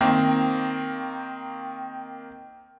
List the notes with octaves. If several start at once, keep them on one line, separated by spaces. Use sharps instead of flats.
D#3 A#3 C4